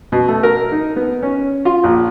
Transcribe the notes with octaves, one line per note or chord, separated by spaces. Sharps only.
B2
A3
A#4
D#4
B3
C#4
F4
A#1